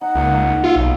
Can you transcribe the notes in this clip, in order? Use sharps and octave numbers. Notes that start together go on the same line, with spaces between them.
D#4 F#5
C#2 A#3
D#4
F4 E5 F5
B1